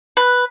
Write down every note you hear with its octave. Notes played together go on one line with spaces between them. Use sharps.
B4